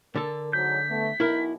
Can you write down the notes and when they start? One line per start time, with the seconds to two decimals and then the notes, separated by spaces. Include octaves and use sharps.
0.16 D3 A4 A#4
0.53 G#2 F#3 G6 B6
0.90 A3 B3
1.20 B1 E4 A#4